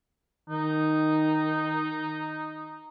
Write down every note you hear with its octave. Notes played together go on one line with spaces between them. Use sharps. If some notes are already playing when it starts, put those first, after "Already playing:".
D#3 D#4